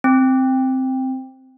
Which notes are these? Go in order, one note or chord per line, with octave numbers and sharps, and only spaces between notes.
C4